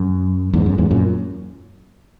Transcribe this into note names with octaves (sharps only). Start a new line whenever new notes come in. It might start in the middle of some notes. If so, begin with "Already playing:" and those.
Already playing: F#2
E2 G#2
F#2
E2 G#2
F#2 A#2